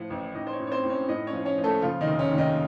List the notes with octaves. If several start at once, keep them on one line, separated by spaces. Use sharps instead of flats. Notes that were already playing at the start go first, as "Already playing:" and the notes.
Already playing: A2 F3
A1
A1 D#4 D#5
C5
C#4 C#5
A2
C#5
C4 C5
A2
C#4 C#5
A2 D#4 D#5
C#4 C#5
F3
C#4 C#5
F3
A3 A4
C#3 F3 F4
D#3 D#4
F1
C#4
D#2
D#3 D#4